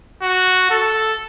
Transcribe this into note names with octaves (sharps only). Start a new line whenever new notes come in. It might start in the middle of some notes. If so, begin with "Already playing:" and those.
F#4
A4